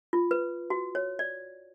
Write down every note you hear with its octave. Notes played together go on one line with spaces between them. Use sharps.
F4
B4
F#4
C#5
D5